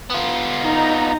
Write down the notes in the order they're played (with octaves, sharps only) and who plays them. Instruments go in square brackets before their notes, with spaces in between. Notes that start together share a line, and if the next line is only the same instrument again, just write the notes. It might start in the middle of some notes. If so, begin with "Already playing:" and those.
[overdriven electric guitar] B3 F4
[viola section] D#4 A#5